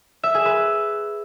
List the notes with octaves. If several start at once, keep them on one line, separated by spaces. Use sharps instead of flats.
E5
G#4
B4